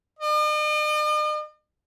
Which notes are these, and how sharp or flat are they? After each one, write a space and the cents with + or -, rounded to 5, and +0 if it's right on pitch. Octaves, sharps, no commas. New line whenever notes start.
D#5 -45